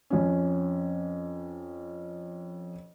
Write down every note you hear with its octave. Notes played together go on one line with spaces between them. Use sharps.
F2 C#4